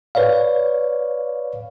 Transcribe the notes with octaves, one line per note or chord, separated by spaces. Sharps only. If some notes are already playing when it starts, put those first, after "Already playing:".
B4 C#5 D5 F5